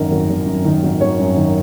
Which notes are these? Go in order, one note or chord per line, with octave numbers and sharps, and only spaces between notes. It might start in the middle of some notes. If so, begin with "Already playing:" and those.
Already playing: G#1 F#2 D#3 A#4
G#1
G#1
F#2
D#3
G#1
G#1 C#5
F#2
D#3